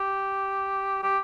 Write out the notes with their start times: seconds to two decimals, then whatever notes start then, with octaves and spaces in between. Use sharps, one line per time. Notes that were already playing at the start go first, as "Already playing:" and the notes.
Already playing: G4
1.03 G4